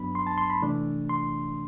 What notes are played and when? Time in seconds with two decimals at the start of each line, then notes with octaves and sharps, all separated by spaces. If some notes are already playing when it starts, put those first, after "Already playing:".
Already playing: G2 F#3 B3 D4 B5
0.15 C6
0.27 A5
0.38 C6
0.50 B5
0.61 C3 E3 A3 D4
1.09 C6